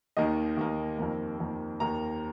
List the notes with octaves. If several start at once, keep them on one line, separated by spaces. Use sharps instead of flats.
D#2 D#3 A#3 D#5
D#2 D#3 A#3
F2 D#3 A#3
F2 D#3 A#3
D#2 D#3 A#3 A#5